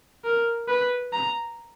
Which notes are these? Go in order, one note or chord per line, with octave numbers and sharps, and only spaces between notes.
A#4
B4
A#5